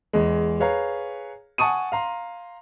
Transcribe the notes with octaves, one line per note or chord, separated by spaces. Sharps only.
E2 G#3
G#4 B4 C#5 F5 A#5
F#5 G#5 A5 C#6 D#6 D#7
F5 A#5 C6